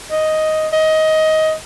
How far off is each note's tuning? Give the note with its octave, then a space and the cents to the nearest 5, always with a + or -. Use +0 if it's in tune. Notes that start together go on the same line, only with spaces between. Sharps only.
D#5 +5
D#5 +15